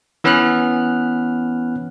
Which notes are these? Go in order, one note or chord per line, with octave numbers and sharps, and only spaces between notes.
E3 B3 C#4 B4 F6 F#6